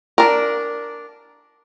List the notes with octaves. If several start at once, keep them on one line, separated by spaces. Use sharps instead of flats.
D4 A#4